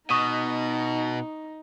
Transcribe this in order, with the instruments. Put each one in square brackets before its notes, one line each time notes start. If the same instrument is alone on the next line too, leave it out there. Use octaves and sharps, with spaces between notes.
[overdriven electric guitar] B2 [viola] D#4 [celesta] C#6 D#6 D#7